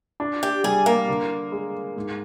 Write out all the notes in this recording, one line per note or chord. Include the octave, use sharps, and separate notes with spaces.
D4
G4
G3 G#4
A#3
D3
G#3
G#2